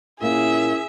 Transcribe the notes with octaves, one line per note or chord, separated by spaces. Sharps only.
A#2 A#3 C#4 E4 G#4 E5